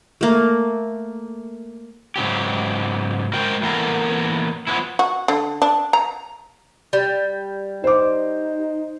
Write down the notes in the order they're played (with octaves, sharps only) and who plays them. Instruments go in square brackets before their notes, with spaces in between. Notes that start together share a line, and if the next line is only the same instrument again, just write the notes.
[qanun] A3 A#3
[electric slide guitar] G#2 C#3 F#3 G4
G#3 F#4 A#4 C5 G5
E3 A#3 B3 C#4 A4 A#4
F3 F#3 G#3 B3 C#4 E4
[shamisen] F#4
D3
D4
A#5
[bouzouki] G3
[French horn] D#4 [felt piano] C5 D6